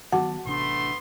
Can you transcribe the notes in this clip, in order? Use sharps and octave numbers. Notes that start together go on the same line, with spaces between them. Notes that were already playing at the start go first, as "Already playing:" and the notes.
D#3 F#3 B3 F#4 F#5 A5 D6
A1 C3 A3 B3 D4 C6